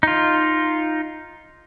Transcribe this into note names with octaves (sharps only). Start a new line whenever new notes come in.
D#4 F4